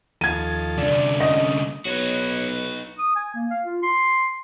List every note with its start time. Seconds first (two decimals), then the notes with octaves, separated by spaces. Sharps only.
0.21 D#2 F3 A4 G#6 D#7
0.78 C2 D3 D5
1.20 C3 A3 C#4 D#5 F#5
1.85 B1 B3 D#4 F#4 B4 C#5
2.99 D#6
3.16 G#5
3.34 A#3
3.51 F5
3.64 F4
3.83 C6